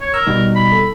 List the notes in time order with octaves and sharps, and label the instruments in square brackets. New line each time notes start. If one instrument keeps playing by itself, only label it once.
[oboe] C#5
[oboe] A#4 [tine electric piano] E6
[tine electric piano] B2 G3 D#4
[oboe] B5
[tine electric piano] A4